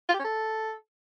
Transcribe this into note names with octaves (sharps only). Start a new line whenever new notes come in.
F4
G4
C#4
A4